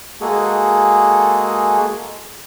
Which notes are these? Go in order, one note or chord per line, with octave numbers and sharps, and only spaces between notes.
G#3 A#3 F#4 G#4 A4